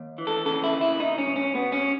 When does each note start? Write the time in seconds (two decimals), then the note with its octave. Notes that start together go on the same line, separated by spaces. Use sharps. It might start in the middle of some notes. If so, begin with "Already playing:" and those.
Already playing: D#2
0.18 E3
0.27 A4
0.45 C#3 A4
0.64 E4
0.72 D#2
0.81 E4
0.99 B2 D#4
1.18 C#4
1.27 B1
1.36 C#4
1.54 B2 B3
1.72 C#4